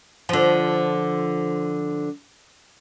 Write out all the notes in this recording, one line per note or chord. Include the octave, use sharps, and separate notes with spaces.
D3 F3